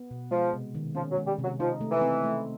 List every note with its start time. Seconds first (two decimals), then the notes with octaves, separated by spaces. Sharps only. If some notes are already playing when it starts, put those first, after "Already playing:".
Already playing: B3
0.11 B2
0.31 F3 G#3
0.53 C3
0.75 D#3
0.95 F3 C#4
1.11 F#3
1.17 G#3
1.27 G3
1.39 C3 F#3
1.59 F3 D#4
1.81 A3
1.91 E3
2.01 C4
2.24 A3